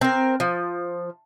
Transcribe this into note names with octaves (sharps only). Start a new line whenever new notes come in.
C4 A#4
F3